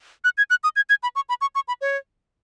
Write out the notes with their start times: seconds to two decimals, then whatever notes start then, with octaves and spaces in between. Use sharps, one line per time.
0.24 F#6
0.38 G#6
0.50 F#6
0.64 D#6
0.76 G#6
0.89 G#6
1.03 B5
1.16 C#6
1.29 B5
1.41 C#6
1.55 C#6
1.68 B5
1.81 C#5